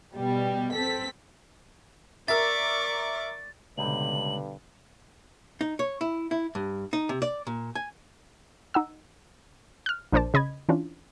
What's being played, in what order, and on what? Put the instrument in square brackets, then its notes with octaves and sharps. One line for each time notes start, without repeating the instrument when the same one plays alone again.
[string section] B2 G3
C4 A4 B6
[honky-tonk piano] A#4 E5 [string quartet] D5 C#6 D6 [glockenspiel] A6
[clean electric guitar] C#2 [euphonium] G2 [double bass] B2 D3 [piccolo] F#7
[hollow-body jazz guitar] D#4
C#5
E4
E4
G2
D#4
C3
D5
A#2
G#5
[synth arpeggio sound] D#4 F#5 E6
F6 F#6
A#1 D4 A#4 C5 D5 A5
C#3 D#5 B5 G#6
E3 C#4 D4 E4 F4